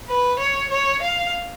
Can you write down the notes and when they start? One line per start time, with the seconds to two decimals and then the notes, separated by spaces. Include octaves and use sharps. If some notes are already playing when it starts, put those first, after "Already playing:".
0.09 B4
0.40 C#5
0.71 C#5
1.03 F5